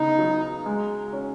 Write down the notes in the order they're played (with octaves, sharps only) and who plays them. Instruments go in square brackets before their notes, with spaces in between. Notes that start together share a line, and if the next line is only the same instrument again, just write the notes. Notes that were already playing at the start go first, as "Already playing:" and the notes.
Already playing: [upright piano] C#3 B3 [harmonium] D#4
[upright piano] F#3
G#3
C#4